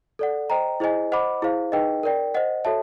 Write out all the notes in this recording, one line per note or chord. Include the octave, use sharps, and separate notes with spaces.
A4 D5 F#5
C5 D#5 G5 A#5
E4 G#4 C5 D#5 G#5
C5 D#5 F#5 B5 D6
E4 G#4 C5 F5
D#4 G#4 B4 D#5 G5
A#4 D5 G5
C5 D#5 F#5
F#4 A4 C#5 E5 A5